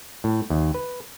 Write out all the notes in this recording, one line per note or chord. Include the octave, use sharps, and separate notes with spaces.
A2
D#2
B4